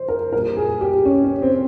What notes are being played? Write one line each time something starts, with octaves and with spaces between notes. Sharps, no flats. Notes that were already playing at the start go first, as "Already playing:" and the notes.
Already playing: F3 C5
A#4
A#2 G3 A#4
G#4
G4
C#4
C#4
C4